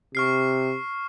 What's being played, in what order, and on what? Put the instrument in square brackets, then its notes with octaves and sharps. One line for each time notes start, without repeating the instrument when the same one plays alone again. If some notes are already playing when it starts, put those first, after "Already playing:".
[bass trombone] C3 [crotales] C#6 F6 C7